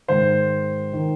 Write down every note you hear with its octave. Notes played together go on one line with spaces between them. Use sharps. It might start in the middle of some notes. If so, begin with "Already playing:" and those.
G#2 D#3 C5
D#3